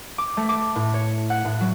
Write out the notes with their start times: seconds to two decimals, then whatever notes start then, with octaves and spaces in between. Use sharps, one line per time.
0.18 D6
0.37 A3
0.49 D6
0.76 A2
0.94 C#5
1.30 F#5
1.45 A2
1.61 F#3